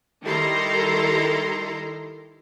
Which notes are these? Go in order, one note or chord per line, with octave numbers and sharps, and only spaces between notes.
D#3 G3 E4 A4 A#5 C6